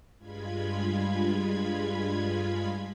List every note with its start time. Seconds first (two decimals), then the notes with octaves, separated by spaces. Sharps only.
0.18 G2 G#3 F4 B5 G#6